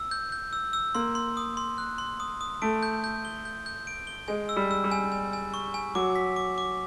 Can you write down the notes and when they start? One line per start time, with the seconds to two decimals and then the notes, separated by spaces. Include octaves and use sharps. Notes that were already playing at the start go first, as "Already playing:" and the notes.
Already playing: E6
0.11 G6
0.32 G6
0.53 E6
0.73 E6
0.95 A#3 C6
1.15 C6
1.37 D#6
1.57 C6
1.78 F#6
1.98 C6
2.20 D#6
2.41 D#6
2.62 A3 D7
2.83 G6
3.04 G6
3.25 G7
3.45 G6
3.66 G6
3.87 D7
4.07 G7
4.28 G#3 G#5
4.49 E6
4.56 G3
4.71 E6
4.84 G3
4.92 G#5
5.12 G#5
5.33 G#5
5.54 C#6
5.74 G#5
5.95 F#3 D6
6.16 B6
6.36 D6
6.58 D6